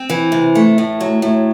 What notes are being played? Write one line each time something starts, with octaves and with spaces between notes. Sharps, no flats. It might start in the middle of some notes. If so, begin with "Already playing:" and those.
Already playing: C4
E3
C3
A3
A2
F#3
A2